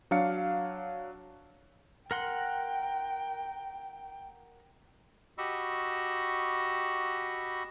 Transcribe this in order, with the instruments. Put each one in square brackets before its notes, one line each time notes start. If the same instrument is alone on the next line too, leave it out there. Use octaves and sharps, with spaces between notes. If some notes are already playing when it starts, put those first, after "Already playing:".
[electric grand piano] F#3 D4 F5 C#7
[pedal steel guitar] A#4 F#5 C6 [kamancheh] G5
[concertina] F#4 G4 D#5 B5 C#6 E6